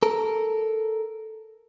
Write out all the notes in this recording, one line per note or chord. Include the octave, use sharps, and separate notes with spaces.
A4 A#4